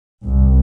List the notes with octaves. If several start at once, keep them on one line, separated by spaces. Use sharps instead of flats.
C2